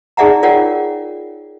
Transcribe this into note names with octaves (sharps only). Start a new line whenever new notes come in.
D#4 G#4 D5 E5 F#5 A#5
F4 A#4 C#5 D5 F#5 G5